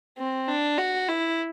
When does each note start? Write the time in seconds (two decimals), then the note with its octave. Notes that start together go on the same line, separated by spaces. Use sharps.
0.18 C4
0.48 D4
0.78 F#4
1.08 E4